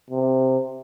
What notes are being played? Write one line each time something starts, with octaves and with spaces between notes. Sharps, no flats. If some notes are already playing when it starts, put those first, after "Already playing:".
C3